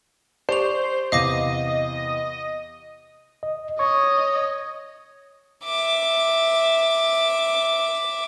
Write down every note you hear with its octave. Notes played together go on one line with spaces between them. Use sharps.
G4 C5 D5 C#6 F7
E2 C3 D#5 F5 D6 A#6
D#5
C#5 D#5 C#6
E5 D6